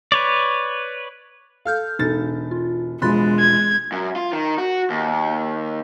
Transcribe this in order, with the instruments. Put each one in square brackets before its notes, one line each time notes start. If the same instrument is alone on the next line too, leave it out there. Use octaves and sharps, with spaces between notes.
[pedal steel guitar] B4 C#5 D5
[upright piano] A4 [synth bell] F5 F6 G6
[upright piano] E1 A4 A6 [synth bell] D#4
[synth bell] F4
[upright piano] E1 F3 B5 [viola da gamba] G#3 [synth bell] C6 F#6 A6
[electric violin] G#6
[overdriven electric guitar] F#2
F4
D#3
F#4
D#2